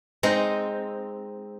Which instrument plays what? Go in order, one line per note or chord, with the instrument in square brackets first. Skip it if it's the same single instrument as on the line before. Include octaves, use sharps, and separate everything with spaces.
[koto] G#3 C4 D#4